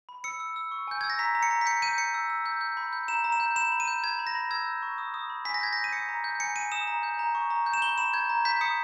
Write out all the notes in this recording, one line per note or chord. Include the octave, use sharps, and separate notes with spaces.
B5
E6 C#7
E6
E6
C#6
G#5 G6
E6 G#6
A#6
A#5 B6
A#5
C#7
A#5
B6
G6 C#7
G6 D#7
G6 C#7
E6
E6
G6
G6
B5
G6
A#5 E7
A#5
E7
G6
B5 E7
B5
D#7
G6
B5 G#6
B5
A#6
B5
E6 G#6
G6
C#6
D#6
D#6
B5
G#5 B6
A#6
G6 G#6
G6 A#6
D#7
D#6 C#7
A#5
G6
G#5 C#7
G#5 D#7
D#6 E7
A#5
G6
A#5
C#6
A#5
G6
E7
B5 G7
B5 E7
G6 G#6
A#5
G6 B6
D#6 C#7